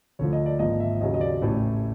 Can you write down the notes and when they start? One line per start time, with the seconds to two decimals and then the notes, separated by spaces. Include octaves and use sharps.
0.19 D2 D3 F3 C#5
0.33 D#5
0.46 D5
0.59 G#1 G#2 F3 A#3 D#5
0.80 E5
1.01 D#2 C#3 F#3 D#5
1.14 D#5
1.21 D5
1.42 A1 A2 E3 A3